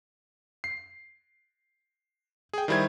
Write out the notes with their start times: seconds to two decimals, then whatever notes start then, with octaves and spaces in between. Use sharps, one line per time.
0.64 C7
2.53 G#4 G5
2.68 D#3 G3 E4 C5 G#6